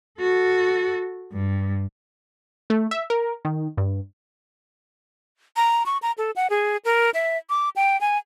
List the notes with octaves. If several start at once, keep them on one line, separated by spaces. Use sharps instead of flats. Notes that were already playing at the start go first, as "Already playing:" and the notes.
F#4 A4
G2
A3
E5
A#4
D#3
G2
A#5
C#6
A#5
A4
F#5
G#4
A#4
E5
D6
G5
G#5